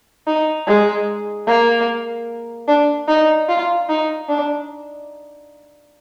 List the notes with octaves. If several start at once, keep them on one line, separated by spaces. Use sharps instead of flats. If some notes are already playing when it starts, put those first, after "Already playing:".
D#4
G#3
A#3
D4
D#4
F4
D#4
D4